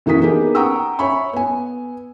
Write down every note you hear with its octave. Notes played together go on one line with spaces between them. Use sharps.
F#1 E3 A#3 F#4 D#6 B6
A#3 B3 D4 D#4 G4 G#4
F#5 G5 A#5 C#6 D#6 E6
C#5 E5 G#5 B5 C#6
B3 G#5